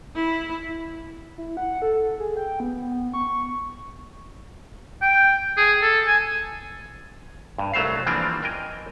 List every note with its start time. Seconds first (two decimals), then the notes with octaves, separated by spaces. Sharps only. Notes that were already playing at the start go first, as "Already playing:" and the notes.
0.15 E4
1.38 E4
1.57 F#5
1.82 A4
2.20 G#4
2.37 G5
2.60 B3
3.14 C#6
5.02 G5
5.57 G#4
5.82 A4
6.07 G#5
7.58 G2
7.74 C2 F#3 A3 C5 F5
8.07 E3 F3 G3 A#3 C4 D4
8.42 A#4 D#5 G5 G#5